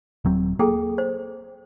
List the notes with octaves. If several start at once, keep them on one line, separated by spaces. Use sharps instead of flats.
D#1 F#3 C4
A#3 G#4 A4 G5
C5